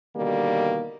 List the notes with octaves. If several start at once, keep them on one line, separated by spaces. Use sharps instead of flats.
B2 D3 D#3 G3 A#3